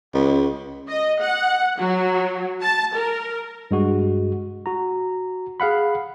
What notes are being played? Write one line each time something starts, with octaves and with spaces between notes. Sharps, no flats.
C#2
D#5
F#5
F#3
A5
A#4
G2 G#3 F#4
F#4 A#5
G#4 F5 F#5 B5